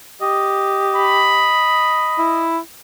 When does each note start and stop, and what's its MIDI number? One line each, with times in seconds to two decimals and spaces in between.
0.22 1.54 67
0.22 2.46 75
0.96 2.34 83
2.18 2.58 64